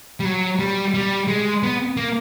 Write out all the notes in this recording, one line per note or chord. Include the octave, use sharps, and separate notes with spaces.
G3
F#3
G3
G3
G#3
B3
A#3